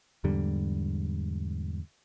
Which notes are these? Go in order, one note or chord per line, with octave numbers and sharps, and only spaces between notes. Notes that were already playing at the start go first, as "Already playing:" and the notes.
E2 G#2 D3 G3